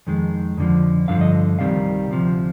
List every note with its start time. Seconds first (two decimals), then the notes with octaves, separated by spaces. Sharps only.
0.07 F2 D#3 G#3
0.57 F2 D3 F3
1.08 G2 D3 F3 F5
1.21 D#5
1.59 C2 C3 D#3 G3 F5
2.10 D2 C3 F3